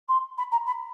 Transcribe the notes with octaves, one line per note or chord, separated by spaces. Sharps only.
C6
B5
A#5
B5